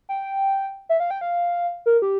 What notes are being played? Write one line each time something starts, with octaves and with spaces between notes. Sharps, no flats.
G5
E5
F5
G5
F5
A#4
G4